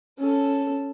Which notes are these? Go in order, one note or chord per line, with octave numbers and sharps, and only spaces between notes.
C#4 A4